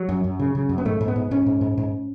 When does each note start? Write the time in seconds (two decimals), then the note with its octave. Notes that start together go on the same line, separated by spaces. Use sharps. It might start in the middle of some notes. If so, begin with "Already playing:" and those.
Already playing: F#3
0.09 F#2
0.24 F#2
0.39 C#3
0.55 C#3
0.69 F#2
0.78 B3
0.85 G#2 A3
1.01 G#2
1.08 B3
1.16 G#2
1.31 G#2 C#4
1.46 G#2
1.61 G#2
1.77 G#2